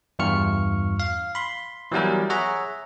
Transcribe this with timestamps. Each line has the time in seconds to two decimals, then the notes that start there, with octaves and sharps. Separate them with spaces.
0.19 E2 G2 F4 C#6 F6 C#7
1.00 F5
1.35 B5 C6
1.92 E3 F#3 G3 B3 E4 A#4
2.30 G#4 C#5 E5 F#5 A#5